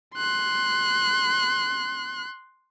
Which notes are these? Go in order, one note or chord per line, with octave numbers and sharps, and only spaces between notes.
C6 F#6